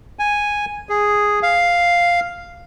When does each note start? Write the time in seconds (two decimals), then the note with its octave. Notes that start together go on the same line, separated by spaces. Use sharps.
0.19 G#5
0.89 G#4
1.43 F5